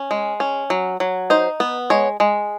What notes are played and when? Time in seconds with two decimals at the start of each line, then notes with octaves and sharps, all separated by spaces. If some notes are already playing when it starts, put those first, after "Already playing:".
Already playing: C#4
0.11 G#3
0.40 C#4
0.70 F#3
1.00 F#3
1.30 D#4 C5
1.60 B3
1.90 G#3 C#5
2.20 G#3